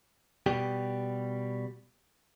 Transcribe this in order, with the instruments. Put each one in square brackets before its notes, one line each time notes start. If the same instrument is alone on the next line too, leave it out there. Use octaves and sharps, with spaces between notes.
[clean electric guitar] B2 G3 G4